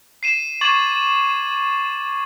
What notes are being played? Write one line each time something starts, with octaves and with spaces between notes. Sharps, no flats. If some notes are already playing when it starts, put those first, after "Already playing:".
C7 D#7 E7
C#6 D6 G#6 A6 E7 F#7